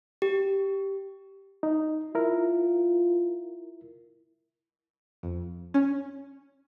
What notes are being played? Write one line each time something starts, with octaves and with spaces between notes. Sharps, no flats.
G4
D#4
E4 F4 A#4
F2
C#4